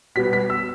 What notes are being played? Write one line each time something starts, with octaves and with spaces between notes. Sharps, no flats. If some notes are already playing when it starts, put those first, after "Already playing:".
B2 G3 B3 B6
B6
E6